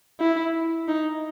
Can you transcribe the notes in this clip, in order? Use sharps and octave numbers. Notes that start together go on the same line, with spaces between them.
E4
D#4